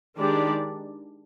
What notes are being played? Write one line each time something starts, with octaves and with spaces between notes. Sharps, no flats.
D#3 G#3 D4 G4 D5